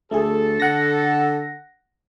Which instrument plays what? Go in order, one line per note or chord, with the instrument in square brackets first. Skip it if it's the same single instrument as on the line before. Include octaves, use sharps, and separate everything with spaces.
[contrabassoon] D2 [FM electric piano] A3 G#4 [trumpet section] A4
[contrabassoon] D3 [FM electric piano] F#5 A#6